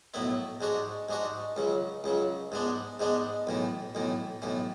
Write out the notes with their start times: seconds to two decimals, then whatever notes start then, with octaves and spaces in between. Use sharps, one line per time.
0.14 B1 A2 F#3 B3 E4
0.61 G#2 G#3 D4 F#4
1.09 G#2 G#3 D4 F#4
1.56 C#2 C#3 F#3
2.04 C#2 C#3 F#3
2.52 G#2 G#3 B3 D4
3.00 G#2 G#3 B3 D4
3.47 B1 A2 E3
3.95 B1 A2 E3
4.42 B1 A2 E3